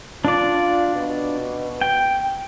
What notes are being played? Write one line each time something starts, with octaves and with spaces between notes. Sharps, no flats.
D4 F4 D5
B2
G5